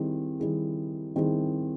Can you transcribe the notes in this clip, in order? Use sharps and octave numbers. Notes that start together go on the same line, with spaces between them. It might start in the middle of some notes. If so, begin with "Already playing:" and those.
Already playing: D#3 G3 C4 E4 G#4
D#3 G3 C4 E4 G#4
D#3 G3 C4 E4 G#4